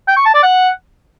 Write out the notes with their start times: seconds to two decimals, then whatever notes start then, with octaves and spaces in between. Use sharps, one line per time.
0.08 G5
0.16 C#6
0.25 A5
0.34 D5
0.43 F#5